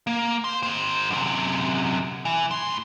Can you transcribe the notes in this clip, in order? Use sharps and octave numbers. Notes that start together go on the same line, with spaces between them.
A#3
C5 C6
D#3 C5
F#2 C3
E3
A2 C6